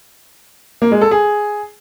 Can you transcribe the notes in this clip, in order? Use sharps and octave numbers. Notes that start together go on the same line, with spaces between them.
A#3
G#3
A4
G#4